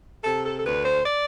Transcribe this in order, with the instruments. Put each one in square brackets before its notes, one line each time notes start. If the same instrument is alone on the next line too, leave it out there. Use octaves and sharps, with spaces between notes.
[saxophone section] C3 A4
A4
A4
D2 B4
C5
D5